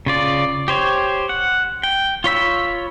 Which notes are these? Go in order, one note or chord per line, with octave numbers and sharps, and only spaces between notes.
C#3 F4 D5
G4 C5 C#5
F#5
G5
F4 C#5 B5 E6